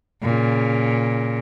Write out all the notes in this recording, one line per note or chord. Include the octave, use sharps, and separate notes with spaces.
A#2 C#3